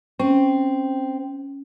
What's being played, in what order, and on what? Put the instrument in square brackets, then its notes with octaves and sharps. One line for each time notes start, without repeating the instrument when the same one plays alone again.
[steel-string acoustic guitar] C4 [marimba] C#4